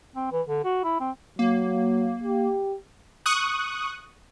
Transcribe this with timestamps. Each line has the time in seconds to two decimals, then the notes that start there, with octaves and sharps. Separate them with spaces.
0.16 C4
0.32 E3
0.48 D3
0.65 F#4
0.84 E4
1.00 C4
1.39 F#3 A#3
2.24 G4
3.26 C#6 D#6 F#6